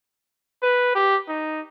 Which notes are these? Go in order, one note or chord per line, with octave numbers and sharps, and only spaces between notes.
B4
G4
D#4